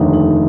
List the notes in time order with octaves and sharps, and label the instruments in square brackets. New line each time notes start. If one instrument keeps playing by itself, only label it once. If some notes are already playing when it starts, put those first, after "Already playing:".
Already playing: [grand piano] F1 D#2 D3 [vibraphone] D#4
[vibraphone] D#4